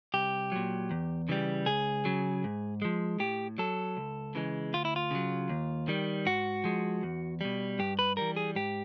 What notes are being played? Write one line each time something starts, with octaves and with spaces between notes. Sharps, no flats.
C2 G4
A#2 F#3
E2
C#3 E3 G3
C#2 G#4
C#3 F#3
G#2
F3 G#3
A2 G4
F#3 A4
C#2
C#3 E3 G#3
D2 F4
E4
F4
C#3 F#3
D#2
D#3 G3
G#2 F#4
F3 G#3
E2
B2 G3
G2 G4
B4
E3 G3 A#4
G#4
G#2 G4